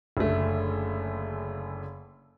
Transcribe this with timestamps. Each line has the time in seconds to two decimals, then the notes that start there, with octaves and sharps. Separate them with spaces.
0.17 F#1 D3 A3